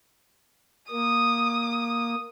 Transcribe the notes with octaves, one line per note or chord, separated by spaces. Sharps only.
A#3 D#6